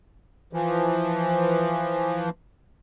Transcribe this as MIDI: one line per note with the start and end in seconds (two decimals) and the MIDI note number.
0.53 2.29 52
0.53 2.29 53